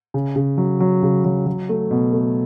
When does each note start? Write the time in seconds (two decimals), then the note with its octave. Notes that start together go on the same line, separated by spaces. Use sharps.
0.14 C#3
0.36 C#3
0.58 F#3
0.80 F#3
1.03 C#3
1.25 F#3
1.47 F#3
1.69 A3
1.91 B2
2.13 A3